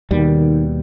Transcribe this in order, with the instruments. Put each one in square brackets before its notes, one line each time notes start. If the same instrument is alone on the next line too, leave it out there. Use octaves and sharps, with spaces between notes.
[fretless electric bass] D#2 B2 G3 [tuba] D#3